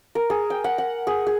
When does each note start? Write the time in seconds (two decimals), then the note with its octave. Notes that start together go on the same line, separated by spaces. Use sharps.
0.15 A#4
0.30 G#4
0.50 G5
0.64 F#5
0.78 F#5
1.07 G#4
1.27 G#4